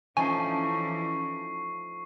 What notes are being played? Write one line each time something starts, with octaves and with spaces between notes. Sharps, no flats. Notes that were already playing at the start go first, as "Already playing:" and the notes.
E3 F3 A3 C#4 D#4 G#5 C#6 C7